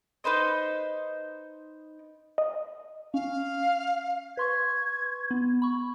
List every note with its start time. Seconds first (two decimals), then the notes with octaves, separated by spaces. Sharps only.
0.24 D#4 B4 C5 D#5
2.38 D#5
3.14 C#4 F5
4.37 B4 C6 C#6 G#6
5.31 B3
5.62 B5 C#6